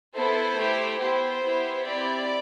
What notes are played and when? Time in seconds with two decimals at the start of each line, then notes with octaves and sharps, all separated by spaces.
0.15 B3 E4 A4 C5
0.57 A3 E4 G4
1.00 B3 E4 G4 C5
1.43 B3 E4 G4
1.85 C4 E4 G4 D5